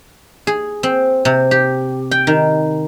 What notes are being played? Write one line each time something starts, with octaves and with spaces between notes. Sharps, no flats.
G#4
C4
C3
G4
G5
D#3